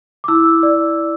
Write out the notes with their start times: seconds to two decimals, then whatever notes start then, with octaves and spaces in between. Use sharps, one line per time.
0.24 D6
0.28 E4 E6
0.63 D5